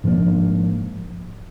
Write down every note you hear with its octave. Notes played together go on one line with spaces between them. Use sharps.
G#2 F3 A#3 D4